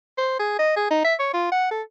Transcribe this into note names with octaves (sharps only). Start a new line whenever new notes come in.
C5
G#4
D#5
G#4
D#4
E5
C#5
F4
F#5
A4